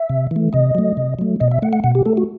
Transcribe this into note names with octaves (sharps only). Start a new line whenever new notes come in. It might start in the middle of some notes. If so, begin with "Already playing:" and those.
Already playing: E5
C3
E3 A3
C3 D#5
F#3 A3
C3
F#3 A3
B2 D#5
E5
A3 F#5
F#5
B2 F#5
G4
A3 A4
F#4